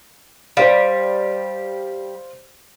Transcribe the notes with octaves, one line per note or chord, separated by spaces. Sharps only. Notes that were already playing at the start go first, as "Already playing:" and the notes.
G3 C5 F5